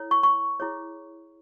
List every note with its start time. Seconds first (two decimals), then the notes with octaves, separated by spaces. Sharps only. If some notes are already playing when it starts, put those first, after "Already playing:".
Already playing: E4 A4 C#5
0.11 C#6
0.23 C#6
0.60 E4 G#4 C#5